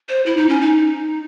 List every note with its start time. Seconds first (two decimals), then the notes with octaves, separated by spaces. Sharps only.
0.09 C5
0.26 E4
0.37 D#4
0.49 C#4
0.61 D#4